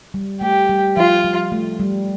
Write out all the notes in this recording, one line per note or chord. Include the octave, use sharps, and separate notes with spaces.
G3
A3 G4
G3
F3 F4
G3
A3
G3